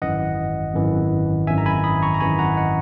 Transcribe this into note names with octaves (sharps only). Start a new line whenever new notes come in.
G#1 F#2 E3 D#5 F#5
G#1 F#2 E3
G#1 F#2 E3 E5 G#5
A#5
G#5 B5
B5 D#6
A#5 C#6
A#5
G#1 F#2 E3 G#5 B5
F#5 A#5
D#5 F#5